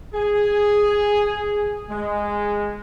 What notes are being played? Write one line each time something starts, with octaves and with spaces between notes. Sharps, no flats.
G#4
G#3